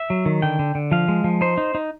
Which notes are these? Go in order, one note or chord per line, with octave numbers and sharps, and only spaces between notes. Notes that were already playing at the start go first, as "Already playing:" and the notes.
Already playing: E5
F#3
D#3
D3 G5
D3
D3
F3 F5
G#3
F3
D#4 C5
D#4
D#4